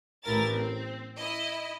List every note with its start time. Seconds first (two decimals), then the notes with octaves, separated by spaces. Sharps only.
0.23 A1 E4 A#4 A6
0.53 C4
1.17 E4 D#5